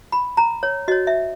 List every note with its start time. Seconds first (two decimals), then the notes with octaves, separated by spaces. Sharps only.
0.12 B5
0.37 A#5
0.63 C#5
0.88 F#4 C#5 D#5
1.07 E5